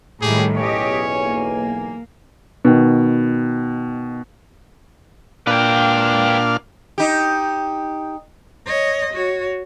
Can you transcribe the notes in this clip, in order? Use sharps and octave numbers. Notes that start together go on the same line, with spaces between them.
A2 D#3 G3 G4 G#4
B1 E2 C#4 G4 C#5 D#5 G#5
A#3
B2 D#3
A#2 D4 B4 F5 G5
D#4 G4
C#5 D#5
F#4 C#5